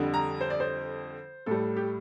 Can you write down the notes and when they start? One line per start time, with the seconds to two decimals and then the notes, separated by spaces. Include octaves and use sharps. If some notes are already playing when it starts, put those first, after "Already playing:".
Already playing: F2 D3 G3
0.14 A#5
0.41 C5
0.50 D5
0.60 C5
1.46 A2 G3 A4
1.77 G4